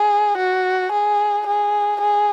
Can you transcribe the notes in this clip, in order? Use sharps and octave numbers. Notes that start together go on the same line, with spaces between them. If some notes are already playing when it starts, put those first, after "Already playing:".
Already playing: G#4
F#4
G#4
G#4
G#4